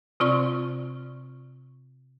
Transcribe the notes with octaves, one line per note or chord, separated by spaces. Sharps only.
C3 C4 F4 D5 C#6